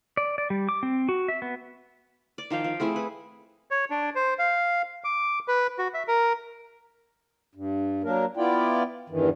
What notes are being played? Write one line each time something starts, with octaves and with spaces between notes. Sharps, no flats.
D5
D5
G3
D6
C4
F#4
E5
B3
D5
D#3 F3 F5 G5
F3
A3 C4 E4 G#4
B4
C#5
D4
C5
F5
D6
B4
F#4
E5
A#4
G2
F#3 A#3 D4 A#4
B3 E4 F4 D5 G5
E2 G2 D#3 E3